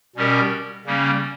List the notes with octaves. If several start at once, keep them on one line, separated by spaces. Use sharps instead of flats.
B2 G3 C#4 G4 A#4
C#3 G3 A#3 C#4